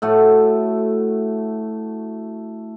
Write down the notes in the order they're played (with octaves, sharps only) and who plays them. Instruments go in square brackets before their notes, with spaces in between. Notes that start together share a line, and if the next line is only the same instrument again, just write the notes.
[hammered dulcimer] A2 A3 F#4